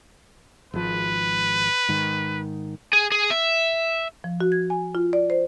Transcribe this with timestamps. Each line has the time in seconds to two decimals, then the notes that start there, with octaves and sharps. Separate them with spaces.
0.74 G#1 F3 B4
1.89 G#2 D#3
2.93 G#4
3.12 G#4
3.30 E5
4.24 F3
4.41 F#4
4.52 G#6
4.70 G#5
4.95 F4
5.13 D5
5.30 C5